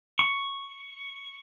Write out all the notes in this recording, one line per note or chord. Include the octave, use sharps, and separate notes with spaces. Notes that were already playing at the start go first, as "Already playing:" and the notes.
C#6